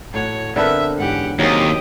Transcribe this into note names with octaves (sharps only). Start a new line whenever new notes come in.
A2 F#4 C#5 F#5
D3 B3 C4 A4 A#4 E5
G#2 E3 C#4 G4 F#5
D#2 C3 F#3 A#3 G4 G#4 C5 D#5